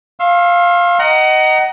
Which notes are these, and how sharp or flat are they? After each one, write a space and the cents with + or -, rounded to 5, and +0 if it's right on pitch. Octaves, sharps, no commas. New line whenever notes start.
F5 +0 C6 +45 E6 +0
D#5 +0 F#5 +30 A#5 +0